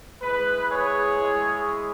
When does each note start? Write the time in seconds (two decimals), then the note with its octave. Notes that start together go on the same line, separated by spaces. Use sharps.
0.21 G#3 E4 B4
0.69 G#4 C#5
1.17 G#3 E4